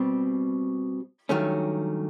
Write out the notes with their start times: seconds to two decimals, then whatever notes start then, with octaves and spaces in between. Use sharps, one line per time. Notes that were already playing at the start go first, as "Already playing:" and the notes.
Already playing: B2 G3 C4
1.29 G2 D#3 F#3 A3 C#4